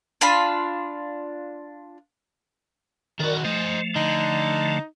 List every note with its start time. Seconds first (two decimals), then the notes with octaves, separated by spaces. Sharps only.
0.21 D4 F4 F5 B5
3.20 D#3 F#4 A#4 D5
3.45 F3 A3 C5 D#5
3.96 D3 D#4